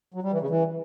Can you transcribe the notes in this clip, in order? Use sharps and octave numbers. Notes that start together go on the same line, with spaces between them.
F#3
G3
E3
C#3
E3